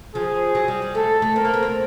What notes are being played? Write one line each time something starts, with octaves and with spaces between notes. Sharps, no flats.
F3 G#4
F#3
G3
G3
A3 A4
A3
C4 A#4
A#3
B3
C4